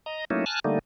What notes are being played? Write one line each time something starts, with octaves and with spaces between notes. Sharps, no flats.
D#5 A#5
F#3 A3 A#3 C#4 D#4 E4
G#5 A5 F6 F#6
D3 G3 A3 A#3 D#4